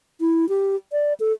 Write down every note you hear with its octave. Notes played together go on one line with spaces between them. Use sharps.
E4
G4
D5
A4